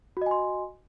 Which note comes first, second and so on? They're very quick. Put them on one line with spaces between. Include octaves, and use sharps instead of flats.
F#4 D#5 G#5 C6